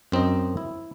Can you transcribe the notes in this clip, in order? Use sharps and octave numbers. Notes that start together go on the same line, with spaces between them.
F#2 C4 D#4 D#5
E4